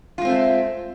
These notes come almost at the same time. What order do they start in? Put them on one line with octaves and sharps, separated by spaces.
F4 G#3 C4 A3